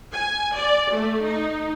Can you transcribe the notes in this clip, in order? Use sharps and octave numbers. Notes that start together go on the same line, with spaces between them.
G#5
D5
A3
D#4